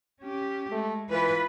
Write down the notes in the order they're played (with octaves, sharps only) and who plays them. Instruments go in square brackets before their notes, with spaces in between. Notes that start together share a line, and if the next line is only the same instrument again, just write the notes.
[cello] C#4 G4
[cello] G#3 [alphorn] A3
[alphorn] E3 [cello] F4 [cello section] B4